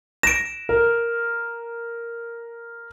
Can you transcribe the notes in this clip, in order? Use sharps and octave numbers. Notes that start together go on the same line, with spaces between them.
A#6 D7 E7
A#4